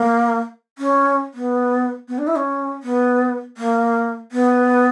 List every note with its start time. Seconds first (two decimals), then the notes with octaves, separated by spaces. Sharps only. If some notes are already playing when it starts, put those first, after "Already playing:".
Already playing: A#3
0.78 C#4
1.34 B3
2.08 B3
2.18 D4
2.27 E4
2.37 C#4
2.83 B3
3.57 A#3
4.32 B3